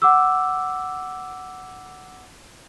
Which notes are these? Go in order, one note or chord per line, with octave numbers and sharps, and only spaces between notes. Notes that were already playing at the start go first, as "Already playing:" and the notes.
F#5 D6 E6